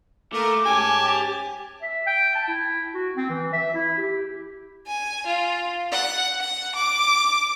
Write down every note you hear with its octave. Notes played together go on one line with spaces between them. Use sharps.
A3 A#3 A#4 D6
G#2 C#4 G4 G#5 A5
E5
G5
A5
E4
F#4
C4
E3
E5
E4
G4
G#5
F4
F#5
F#5
D6